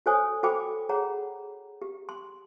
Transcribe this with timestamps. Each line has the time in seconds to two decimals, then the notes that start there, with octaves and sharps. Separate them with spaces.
0.06 F#4 A4 C5 C#5 G#5 D#6
0.43 F#4 A4 C5 G5 B5 D6
0.89 G#4 C#5 F#5 A#5
1.82 G4
2.09 C6